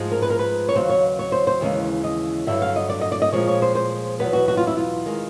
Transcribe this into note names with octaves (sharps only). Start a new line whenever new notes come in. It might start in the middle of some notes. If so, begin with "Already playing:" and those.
Already playing: G#2 F3 G#3
A#4
B4
A#4
B4
C#5
D#2 C#3 F#3 C5
C#5
C#5
C5
C5
D#2 C#3 E3 G#3
D#5
G2 D3 F#3 E5
F5
D#5
D5
D#5
D5
D#5
A#2 F3 G#3 C#5
C#5
C5
C5
E2 B2 F#3 B4
F#4
F#4
F4
E4
F4
D#3 G#3